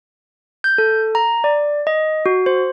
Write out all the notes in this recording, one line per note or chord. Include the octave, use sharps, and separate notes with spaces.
G6
A4
A#5
D5
D#5
F#4
C5